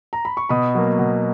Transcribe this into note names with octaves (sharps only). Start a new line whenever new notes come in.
A#5
B5
C#6
B2 B5 D#6
F#3 A#3
B2